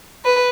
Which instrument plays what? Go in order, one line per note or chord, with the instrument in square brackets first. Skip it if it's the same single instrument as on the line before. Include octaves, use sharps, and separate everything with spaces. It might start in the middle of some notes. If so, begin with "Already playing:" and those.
[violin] B4